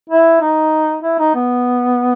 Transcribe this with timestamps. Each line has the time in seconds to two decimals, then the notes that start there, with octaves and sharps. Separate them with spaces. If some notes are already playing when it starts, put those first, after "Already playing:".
0.09 E4
0.41 D#4
1.03 E4
1.19 D#4
1.35 B3